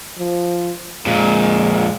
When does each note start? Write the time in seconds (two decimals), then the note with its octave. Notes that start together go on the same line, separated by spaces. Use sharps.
0.19 F3
1.06 F2 A#2 G#3